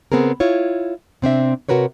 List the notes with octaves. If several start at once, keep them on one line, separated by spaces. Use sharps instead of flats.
C#3 B3 C4 G#4 A#4
E4 F4 C#5
C3 C4 D4 E5
C3 F#4 A#4 B4 C#5